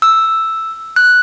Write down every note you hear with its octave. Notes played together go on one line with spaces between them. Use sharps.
E6
F#6